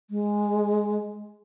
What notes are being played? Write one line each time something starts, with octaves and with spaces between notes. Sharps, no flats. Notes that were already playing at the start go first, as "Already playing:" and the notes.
G#3